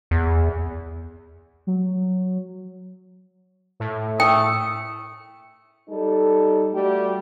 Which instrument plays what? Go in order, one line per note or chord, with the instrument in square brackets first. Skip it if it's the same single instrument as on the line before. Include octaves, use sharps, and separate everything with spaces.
[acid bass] E2
[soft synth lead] F#3
[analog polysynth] A2
[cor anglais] A3 [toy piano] G5 [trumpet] D#6
[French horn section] G3 D#4 A4
G3 A3 F#4 G4